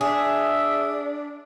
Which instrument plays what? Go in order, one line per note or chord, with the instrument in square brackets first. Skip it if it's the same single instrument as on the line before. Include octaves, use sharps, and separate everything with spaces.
[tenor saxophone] D4 [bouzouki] G#4 [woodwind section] E5